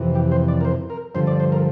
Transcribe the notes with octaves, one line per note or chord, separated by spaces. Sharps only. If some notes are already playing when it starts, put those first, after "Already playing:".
Already playing: F2 C3 E3
G4
C5
D5
A#4
C5
A#4
G2 D3 F3 C5
D5
C5
A#4